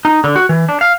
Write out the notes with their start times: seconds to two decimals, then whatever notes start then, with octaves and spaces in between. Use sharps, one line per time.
0.05 D#4
0.24 D3
0.36 F#4
0.49 E3
0.69 D4
0.81 F5